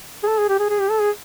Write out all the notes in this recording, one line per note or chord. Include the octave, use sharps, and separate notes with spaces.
G#4
A4
G#4
G4
G#4
G#4
G4
A4
G#4